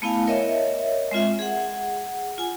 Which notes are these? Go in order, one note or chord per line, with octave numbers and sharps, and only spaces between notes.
A3 B3 E4 F5 G#5
A#4 C#5 D#5 E5
G#3 C4 F4 E5
G#4 F#5
F4 G#5